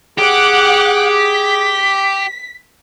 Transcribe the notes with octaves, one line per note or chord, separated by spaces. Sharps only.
G4 G#4 F#5 D6 F#6
B6